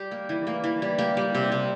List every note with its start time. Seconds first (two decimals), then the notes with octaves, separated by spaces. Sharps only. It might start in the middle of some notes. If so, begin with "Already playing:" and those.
Already playing: G3 G4
0.11 A#3
0.29 E3
0.47 A#3
0.64 E3
0.82 G3
0.98 A#3 G4
1.17 G3
1.35 C3
1.52 C3